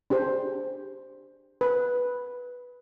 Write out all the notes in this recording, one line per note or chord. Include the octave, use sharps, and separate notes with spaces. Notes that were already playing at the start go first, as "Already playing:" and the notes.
D4 G4 G#4 C5
B4